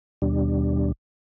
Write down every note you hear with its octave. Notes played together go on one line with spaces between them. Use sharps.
D#2 B2 G3 D4